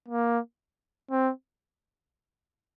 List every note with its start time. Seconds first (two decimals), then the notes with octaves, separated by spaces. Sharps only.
0.09 A#3
1.11 C4